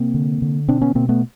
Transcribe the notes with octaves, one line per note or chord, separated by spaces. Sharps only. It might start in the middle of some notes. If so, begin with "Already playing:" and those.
Already playing: C3 A#3 C4
D3
D3
B2 C4 D4
B3 C#4
B2 A#3 C4
A3 B3